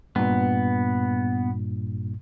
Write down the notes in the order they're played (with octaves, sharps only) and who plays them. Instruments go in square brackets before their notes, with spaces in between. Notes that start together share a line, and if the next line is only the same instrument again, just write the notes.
[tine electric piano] G2 A#2 [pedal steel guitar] B3